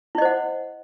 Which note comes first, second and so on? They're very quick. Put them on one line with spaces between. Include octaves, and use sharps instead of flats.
E4 D#5 C5 F#5